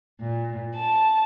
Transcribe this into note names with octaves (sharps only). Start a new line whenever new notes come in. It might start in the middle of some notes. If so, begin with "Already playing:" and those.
A#2
A5